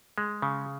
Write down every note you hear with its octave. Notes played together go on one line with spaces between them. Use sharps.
G#3
C#3